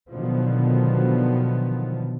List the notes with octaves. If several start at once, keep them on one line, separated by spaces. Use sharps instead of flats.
B2 D3 D#3 F3 F#3 B3